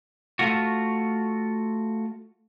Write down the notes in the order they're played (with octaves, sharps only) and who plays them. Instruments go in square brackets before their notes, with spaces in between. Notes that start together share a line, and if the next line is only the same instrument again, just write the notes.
[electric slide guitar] A3 F4 F#4